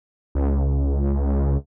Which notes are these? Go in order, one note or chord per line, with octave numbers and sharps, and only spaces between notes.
C#2